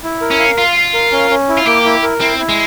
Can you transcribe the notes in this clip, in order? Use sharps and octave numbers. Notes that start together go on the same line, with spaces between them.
E4
A#4
C#4
F5
F4 F5
F5
A#4
C#4
C#4
E4
F4
A#3 G4
E4
A#4
C4 E4
E4
G#3